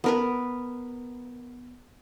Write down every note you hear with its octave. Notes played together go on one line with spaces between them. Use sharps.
B3 A#4 B4